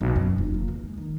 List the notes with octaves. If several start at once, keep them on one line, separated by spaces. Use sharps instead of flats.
B1
F#2
F1
A#3
E2
G#3
D#3